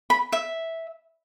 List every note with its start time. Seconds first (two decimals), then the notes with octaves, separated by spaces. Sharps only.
0.10 B5
0.32 E5